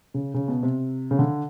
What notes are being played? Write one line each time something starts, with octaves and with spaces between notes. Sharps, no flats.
C#3
C#3
B2
C3
C#3
D3